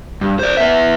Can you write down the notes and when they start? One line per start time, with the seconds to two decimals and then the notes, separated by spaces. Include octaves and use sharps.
0.21 G2
0.39 C5 D5
0.57 B3 E5